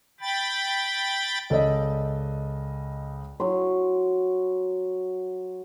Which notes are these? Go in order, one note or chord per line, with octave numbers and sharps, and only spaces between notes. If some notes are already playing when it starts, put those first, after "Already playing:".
G5 B5 A6
C#2 A4 D5 D#5
F#3 C6